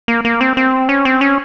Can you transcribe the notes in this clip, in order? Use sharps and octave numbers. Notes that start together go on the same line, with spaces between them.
A#3
A#3
C4
C4
C#4
C4
C#4